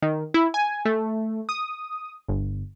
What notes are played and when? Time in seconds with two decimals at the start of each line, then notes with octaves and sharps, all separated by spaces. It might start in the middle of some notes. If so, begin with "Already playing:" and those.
0.02 D#3
0.34 E4
0.54 G#5
0.85 A3
1.49 D#6
2.28 G1